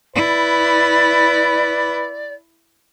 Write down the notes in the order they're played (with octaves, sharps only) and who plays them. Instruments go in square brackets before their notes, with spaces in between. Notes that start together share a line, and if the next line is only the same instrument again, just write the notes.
[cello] E4 [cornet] B4 [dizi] D5